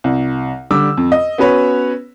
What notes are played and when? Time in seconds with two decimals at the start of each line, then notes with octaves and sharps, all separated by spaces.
0.04 C2
0.71 D3 G3 D6 E6
0.97 F2
1.12 D#5
1.38 B3 C#4 F#4 B4 C#5